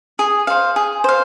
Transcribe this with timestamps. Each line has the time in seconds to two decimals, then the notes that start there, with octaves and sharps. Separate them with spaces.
0.19 G#4
0.47 C5 F5
0.76 G#4
1.04 C5 F5